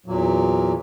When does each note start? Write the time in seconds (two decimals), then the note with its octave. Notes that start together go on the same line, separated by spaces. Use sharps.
0.06 E2 A#2 F#3